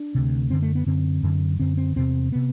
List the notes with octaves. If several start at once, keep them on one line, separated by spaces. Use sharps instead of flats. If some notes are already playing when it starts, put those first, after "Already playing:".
Already playing: D4
D2 C3
F#2 D3 C4
A3
B3
F#2 D3 C4
F#2 D3
F#2 D3 C4
C4
E2 C3 C4
C3 B3